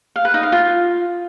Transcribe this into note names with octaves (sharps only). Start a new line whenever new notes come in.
F5
B4
D#4
F5
F4